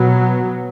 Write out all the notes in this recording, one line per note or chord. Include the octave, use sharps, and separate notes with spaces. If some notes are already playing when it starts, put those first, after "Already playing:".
Already playing: B2 F#3 B3